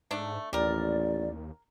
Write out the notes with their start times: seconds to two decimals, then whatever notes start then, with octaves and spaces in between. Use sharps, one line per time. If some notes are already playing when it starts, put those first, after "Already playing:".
0.11 G#2 A3 D4
0.53 A1 D#2 G4 A#4 D5